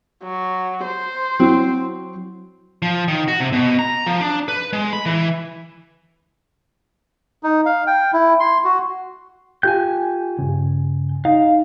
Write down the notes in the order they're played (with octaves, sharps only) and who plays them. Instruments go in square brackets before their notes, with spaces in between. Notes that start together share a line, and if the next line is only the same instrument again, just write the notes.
[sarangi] F#3
C5
[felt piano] F#3 [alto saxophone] C4 [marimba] E4 F#4
[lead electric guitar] F3
D#3
F#4
C3
B2
A#5
F3
D4
B4
G#3
B5
E3
[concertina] D#4
F5
G5
E4
C6
F#4
[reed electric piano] F4 G4 G5 [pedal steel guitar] G#5 G6
[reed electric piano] G2 C#3
[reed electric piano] D#4 [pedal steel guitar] F5